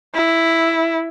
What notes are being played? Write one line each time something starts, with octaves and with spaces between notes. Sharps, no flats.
E4